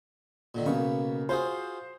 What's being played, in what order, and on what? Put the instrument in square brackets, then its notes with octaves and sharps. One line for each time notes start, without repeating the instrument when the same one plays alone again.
[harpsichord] A#2 D3 D#3
[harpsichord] B1 B3 C#6 [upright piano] C#3 A#3
[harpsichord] F4 F#4 G#4 [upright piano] C5